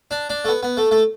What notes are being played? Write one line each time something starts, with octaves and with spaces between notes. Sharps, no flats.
D4
D4
A3
B3
B3
A3
A3